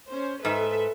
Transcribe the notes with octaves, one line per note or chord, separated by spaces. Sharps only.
C#4 C5
G#2 A4 B4 E5